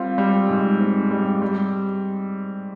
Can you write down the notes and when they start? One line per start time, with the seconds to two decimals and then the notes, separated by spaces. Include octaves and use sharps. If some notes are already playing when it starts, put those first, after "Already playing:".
Already playing: G3 C4 F4
0.18 G3
0.49 G#2
0.81 C4
1.11 G3
1.42 G3